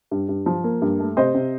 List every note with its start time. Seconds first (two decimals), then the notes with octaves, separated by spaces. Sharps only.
0.11 G2
0.29 G2
0.46 F3
0.64 A#3
0.82 G2
0.99 A3
1.17 C3 C5 D#5
1.35 C3